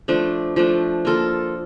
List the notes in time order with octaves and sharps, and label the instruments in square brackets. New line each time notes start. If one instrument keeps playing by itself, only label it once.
[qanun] F3 A3 D4
F3 A3 D4
A#3 F4 A4